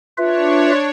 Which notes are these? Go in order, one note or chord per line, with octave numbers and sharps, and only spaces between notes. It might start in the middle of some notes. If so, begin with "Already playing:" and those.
D4 F4 B4 C#5 E5